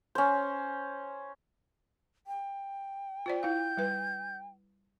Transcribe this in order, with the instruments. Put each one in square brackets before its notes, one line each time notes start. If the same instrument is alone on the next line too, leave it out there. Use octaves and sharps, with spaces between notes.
[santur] C#4 C5
[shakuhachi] G5
[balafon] F4 C5 D5
[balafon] E4 F5 [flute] G6
[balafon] G3 B4